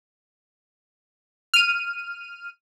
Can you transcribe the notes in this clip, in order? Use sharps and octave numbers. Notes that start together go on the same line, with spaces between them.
F6 D#7